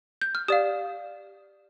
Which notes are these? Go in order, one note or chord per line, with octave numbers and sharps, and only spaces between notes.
G6
F6
G4 D5 F5 D#6